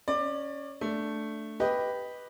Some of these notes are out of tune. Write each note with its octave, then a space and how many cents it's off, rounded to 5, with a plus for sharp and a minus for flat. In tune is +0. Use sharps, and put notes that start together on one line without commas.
C#4 +0 D5 +20
A3 +0 D4 +0
G4 +0 B4 +0 D#5 +0